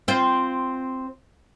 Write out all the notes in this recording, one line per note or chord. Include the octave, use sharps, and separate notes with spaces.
C4 F4 C5